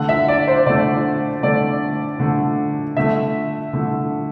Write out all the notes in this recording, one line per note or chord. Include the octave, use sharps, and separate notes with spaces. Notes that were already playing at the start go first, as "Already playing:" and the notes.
Already playing: D3 A3 F#5
E5
D5
C5
D3 A3 D5
D3 A3 D5
D3 A3
D3 A3 E5
D3 A3